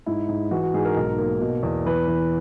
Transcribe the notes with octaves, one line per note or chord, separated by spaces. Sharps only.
G#2 E4
G#2
E3 F#4
F#4
G#2 G#4
A#4
B1
A#3
B2
E2
E3 B4
E3